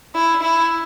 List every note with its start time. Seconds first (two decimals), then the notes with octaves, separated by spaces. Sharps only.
0.15 E4
0.43 E4